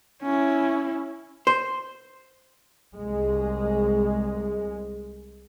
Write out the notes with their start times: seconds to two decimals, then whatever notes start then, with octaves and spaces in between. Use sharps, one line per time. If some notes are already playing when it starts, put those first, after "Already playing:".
0.23 C#4 E4
1.47 C5
2.95 C2 G#3